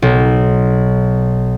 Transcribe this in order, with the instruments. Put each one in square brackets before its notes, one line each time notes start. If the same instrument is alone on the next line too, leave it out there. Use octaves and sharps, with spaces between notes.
[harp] B1